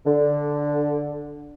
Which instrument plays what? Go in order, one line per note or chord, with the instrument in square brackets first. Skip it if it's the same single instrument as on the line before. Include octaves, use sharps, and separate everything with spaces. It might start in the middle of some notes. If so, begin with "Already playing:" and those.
[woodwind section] D3